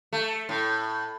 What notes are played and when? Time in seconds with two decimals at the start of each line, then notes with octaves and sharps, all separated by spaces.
0.13 A3
0.49 A2